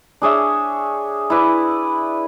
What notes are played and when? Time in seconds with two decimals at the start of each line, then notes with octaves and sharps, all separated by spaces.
0.22 D4 G#4 C#5 E5
1.30 E4 B4 D5